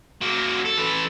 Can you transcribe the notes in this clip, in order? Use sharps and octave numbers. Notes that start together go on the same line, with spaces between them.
F#3 A#3
A4
E3 A4